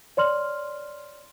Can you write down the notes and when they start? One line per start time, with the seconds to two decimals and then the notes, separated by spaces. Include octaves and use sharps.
0.17 C#5 D5 C6 F6 F#7